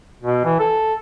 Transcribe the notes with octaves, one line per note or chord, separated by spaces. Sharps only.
B2
E3
A4